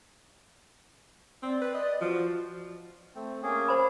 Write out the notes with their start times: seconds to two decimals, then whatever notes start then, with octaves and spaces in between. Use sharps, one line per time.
1.43 C4 D5
1.61 B4
1.75 D#5
2.01 F3 F#4
3.15 A3 C4
3.43 A#3 C#4 G#4
3.68 A4 C5 B5